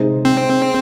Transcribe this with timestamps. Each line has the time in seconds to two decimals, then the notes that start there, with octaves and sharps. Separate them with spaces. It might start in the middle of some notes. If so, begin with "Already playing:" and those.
Already playing: C3 G#3 D#4 G#4 C5
0.25 C4